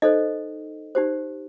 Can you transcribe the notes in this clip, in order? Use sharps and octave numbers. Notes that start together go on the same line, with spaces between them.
D#4 A4 C5 D#5
D#4 G4 C5